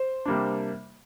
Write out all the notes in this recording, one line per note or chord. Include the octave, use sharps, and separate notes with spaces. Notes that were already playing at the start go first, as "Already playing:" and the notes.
Already playing: C5
C3 G3 A#3 D4